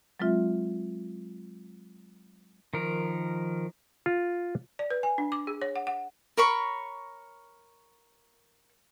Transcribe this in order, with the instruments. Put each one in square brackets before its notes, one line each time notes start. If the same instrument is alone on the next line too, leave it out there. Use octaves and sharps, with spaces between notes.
[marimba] F#3 G#3 C4 F4 E5
[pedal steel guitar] D#3 F3 A#4
[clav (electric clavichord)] F4
[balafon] D5
B4
G#5
D4
D6
G#4
C#5
F#5
F#5
[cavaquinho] A#4 C#5 B5 C#6